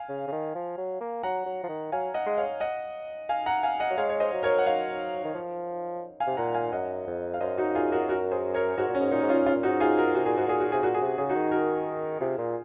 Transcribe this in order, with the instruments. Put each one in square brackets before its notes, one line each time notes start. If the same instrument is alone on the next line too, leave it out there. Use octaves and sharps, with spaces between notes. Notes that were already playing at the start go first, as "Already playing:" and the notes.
Already playing: [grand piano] F5 G#5
[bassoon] C#3
C#3
D#3
F3
F#3
A#3
[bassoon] F#3 [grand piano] F#5 A#5
[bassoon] F#3
F3
D#3
[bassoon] F#3 [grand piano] F5 G#5
[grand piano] D#5 F#5
[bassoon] G#3
[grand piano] C#5 F5
D#5 F#5
F5 G#5
F#5 A#5
F5 G#5
D#5 F#5
[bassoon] F#3
[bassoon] G#3 [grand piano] C#5 F5
[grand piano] C#5
C5 D#5
[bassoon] F#3
[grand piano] A#4 C#5
F#5
[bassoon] F#3 [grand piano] C#5 F5
[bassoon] D#3
F3
[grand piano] F5 G#5
[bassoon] C3
[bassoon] A#2 [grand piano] F#5 A#5
[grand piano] F5 G#5
[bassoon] F#2 [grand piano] D#5 F#5
[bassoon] F2
[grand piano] F5
[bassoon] F#2 [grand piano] C5 D#5
[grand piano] D#4 F#4
F4 G#4
F#4 A#4
F#4 A#4
G#4 C5
A#4 C#5
[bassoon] G#2 [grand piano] F#4 A#4
[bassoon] A#2
[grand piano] C#4
[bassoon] G#2
[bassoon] A#2 [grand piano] D#4
[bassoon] G#2
[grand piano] C#4 F4
[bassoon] A#2
[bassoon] G#2 [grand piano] C#4 F4
[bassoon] A#2
[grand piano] D#4 F#4
[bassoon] G#2
[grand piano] F4 G#4
F#4 A#4
[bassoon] C3 [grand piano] F#4
[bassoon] A#2 [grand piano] G#4
[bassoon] G#2 [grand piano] F#4
[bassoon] A#2 [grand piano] G#4
[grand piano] F#4
[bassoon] C3 [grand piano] G#4
[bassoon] A#2 [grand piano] F#4
[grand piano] G#4
[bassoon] C3
[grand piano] F#4
[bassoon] C#3 [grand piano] G#4
[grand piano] D#4 F#4
[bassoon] D#3
[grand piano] F#4 A#4
[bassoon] C3 [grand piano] F4 G#4
[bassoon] A#2